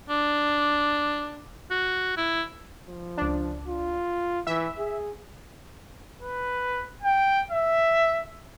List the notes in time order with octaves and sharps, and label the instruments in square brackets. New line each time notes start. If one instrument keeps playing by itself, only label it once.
[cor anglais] D4
F#4
E4
[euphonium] F3
[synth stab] C#2 D4
[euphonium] F4
[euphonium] E3 [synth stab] E5
[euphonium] G#4
[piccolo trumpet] B4
G5
E5